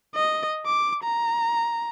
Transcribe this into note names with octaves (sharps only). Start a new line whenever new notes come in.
D#5
D6
A#5